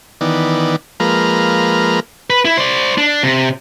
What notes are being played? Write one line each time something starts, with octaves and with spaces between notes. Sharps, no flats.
D#3 E3 B3 D5
F3 G#3 A#3 B4 A#5 F6
B4
E4
C5 D5
D4
C3